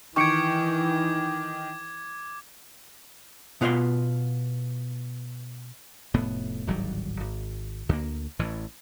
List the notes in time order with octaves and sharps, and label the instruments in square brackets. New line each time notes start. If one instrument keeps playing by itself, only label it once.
[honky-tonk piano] D#3 [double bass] E3 [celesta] C#6 C#7 D7 [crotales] D6 G#6
[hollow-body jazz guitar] B2 B3 F4 B4 F5 C6
[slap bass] F1 A2 B3
D1 G#1 F#3 G3
G#1
D2 A#3
A1 A2 E3